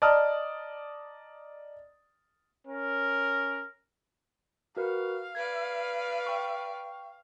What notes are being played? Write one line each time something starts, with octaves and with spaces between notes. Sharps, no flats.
D5 D#5 A5 A#5 D#6 F6
C#4 A#4
F#4 A#4 B4 F5
B4 D5 G#6
G5 C#6